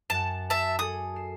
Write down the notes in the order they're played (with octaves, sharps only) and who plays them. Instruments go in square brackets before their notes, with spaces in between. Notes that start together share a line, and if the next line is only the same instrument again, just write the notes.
[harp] F#2 F#5 [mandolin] A5
[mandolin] E5 A5
[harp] G#4 A4 [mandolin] D#6
[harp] C7 E7